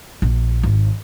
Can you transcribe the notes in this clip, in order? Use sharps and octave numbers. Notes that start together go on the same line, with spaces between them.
A#1
G#1